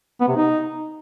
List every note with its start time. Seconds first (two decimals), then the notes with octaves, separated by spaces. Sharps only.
0.20 B3
0.28 C3
0.36 D#4